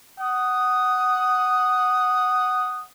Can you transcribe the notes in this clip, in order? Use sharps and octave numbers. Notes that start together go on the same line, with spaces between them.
F#5 D#6